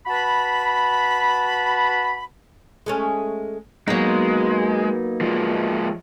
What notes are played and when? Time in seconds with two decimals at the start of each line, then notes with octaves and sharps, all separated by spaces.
0.07 F#4 B4 A5 B5
2.86 G#3 A3 C#4
3.88 F#3 G#3 A#3 B3 D#4
5.21 F3 G#3